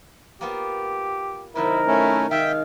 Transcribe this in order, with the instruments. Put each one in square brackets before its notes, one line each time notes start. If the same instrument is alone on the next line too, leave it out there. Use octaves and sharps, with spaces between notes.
[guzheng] A#3 B3 F4 [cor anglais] G4
[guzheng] C3 D#3 F#3 [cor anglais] E4 [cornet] A#4
[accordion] A3 C#4 [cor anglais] E4
[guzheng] D#3 G#3 [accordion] E5 G5 [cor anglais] F5